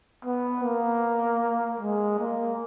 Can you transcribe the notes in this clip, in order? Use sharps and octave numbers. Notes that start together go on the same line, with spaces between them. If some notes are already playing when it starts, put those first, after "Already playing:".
B3
A#3
G#3
A#3